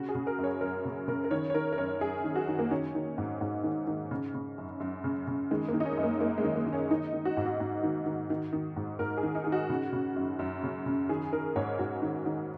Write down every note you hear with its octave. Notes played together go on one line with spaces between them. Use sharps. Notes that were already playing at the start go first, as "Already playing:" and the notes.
Already playing: C#3 F#4
G#4
C#3
A#4
F#2
C#5
F#2 A#4
C#3
C#3 A#4
A#4
D#3 C#5
C#5
D#3 A#4
A#4
F#2 C#5
F#2 G#4
D#3
F#4
D#3
A#3
D#3 C#4
D#3
G#2
G#2
D#3
D#3
C#3
C#3
F#2
F#2
C#3
C#3
D#3 G#3
A#3
D#3
D#4
C#4
F#2
A#3
F#2 A#3
G#3
D#3
A#3
D#3
C#4
D#3 D#4
D#3
F#4
G#2 D#4
F#4
G#2
D#3
D#3
D#3
D#3
G#2
G#2 A#4
G#4
D#3
D#4
D#3 G#4
F#4
C#3
C#3
F#2
F#2
C#3
C#3
D#3 G#4
D#3 A#4
G#2 C#5
G#2 F#4
D#3
D#3